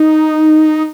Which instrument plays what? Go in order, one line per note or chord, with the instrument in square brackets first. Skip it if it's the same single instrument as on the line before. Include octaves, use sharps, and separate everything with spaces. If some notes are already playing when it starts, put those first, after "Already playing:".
Already playing: [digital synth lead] D#4